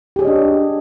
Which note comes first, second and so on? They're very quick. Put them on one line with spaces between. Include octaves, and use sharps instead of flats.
G4 G#4 C#5 D#5 D4